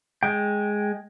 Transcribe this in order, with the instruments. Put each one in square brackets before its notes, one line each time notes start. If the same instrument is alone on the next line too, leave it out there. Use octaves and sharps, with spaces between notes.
[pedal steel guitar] G#3 G5